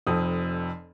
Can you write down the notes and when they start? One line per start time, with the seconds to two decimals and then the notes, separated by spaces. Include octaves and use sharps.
0.07 F1 F2 F3 D#6